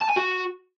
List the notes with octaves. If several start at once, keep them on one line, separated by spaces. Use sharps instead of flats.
A5
G#5
F#4